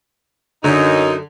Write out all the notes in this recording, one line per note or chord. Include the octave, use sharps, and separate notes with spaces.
F#2 D3 D#4